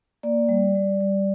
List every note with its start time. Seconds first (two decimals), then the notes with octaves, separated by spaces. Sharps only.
0.23 A#3 D5
0.49 G3
0.75 G3
1.01 G3